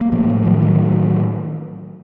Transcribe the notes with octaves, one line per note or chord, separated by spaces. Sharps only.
A#3
A2 F3 A3
F3
D#3 F#3
D#3 F#3